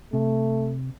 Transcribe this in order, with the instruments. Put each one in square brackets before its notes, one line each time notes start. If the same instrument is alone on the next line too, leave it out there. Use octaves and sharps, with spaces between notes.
[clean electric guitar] C3 [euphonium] A3